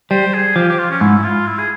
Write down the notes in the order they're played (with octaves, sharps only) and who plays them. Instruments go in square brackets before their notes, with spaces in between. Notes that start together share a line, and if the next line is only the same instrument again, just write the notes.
[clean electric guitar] G3 [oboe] C5
[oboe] G#4
[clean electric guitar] F3 [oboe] G4
[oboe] G4
F4
C#4
[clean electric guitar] G#2 [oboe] E4
[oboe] F4
E4
G#4